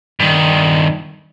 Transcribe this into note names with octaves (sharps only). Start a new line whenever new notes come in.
G2 D#3